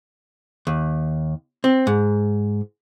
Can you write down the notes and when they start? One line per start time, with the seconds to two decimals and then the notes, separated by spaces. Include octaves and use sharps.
0.67 D#2
1.64 C4
1.87 G#2